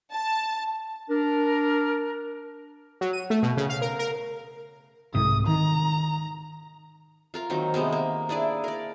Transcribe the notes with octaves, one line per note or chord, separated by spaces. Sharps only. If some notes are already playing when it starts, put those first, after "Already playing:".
A5
D4 A#4
F#3
D#7
A3
B2
C#3
F5
A#4
A#4
C2 G#2 C3 D#6
D#3 A#5
F4 A#4 F5
D#3 F#3 A#3 C4
C3 G#3 A#3 B3
A#3
D4 E4 G#4 D5
A#4 D5